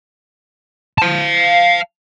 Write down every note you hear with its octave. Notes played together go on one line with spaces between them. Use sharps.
F5 A5